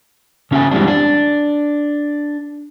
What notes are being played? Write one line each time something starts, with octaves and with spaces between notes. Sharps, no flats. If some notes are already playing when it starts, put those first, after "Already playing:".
C#3 C#4 F#4 E5 G#5
E3 G3 G#3 C4 D4
D4